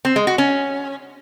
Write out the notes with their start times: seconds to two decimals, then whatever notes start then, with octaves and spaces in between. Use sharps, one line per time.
0.05 C4
0.16 G#3
0.27 F#4
0.38 C#4